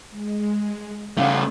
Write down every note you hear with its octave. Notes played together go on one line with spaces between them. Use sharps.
G#3
C#3 A3 C#4 F5 F#5